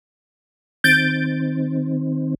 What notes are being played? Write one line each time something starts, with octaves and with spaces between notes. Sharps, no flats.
D#3 C4 G6 A6 D7